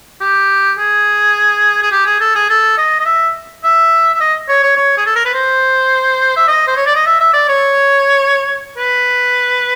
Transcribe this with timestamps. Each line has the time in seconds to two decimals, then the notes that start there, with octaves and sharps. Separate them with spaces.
0.20 G4
0.78 G#4
1.82 G#4
1.91 G4
2.06 G#4
2.20 A4
2.35 G#4
2.49 A4
2.77 D#5
3.00 D#5
3.05 E5
3.63 E5
4.14 E5
4.20 D#5
4.49 C#5
4.63 C#5
4.77 C#5
4.97 G#4
5.06 A4
5.15 A#4
5.25 B4
5.33 C5
6.36 E5
6.48 D#5
6.67 C5
6.76 C#5
6.86 D5
6.95 D#5
7.06 E5
7.20 E5
7.33 D5
7.48 C#5
8.77 B4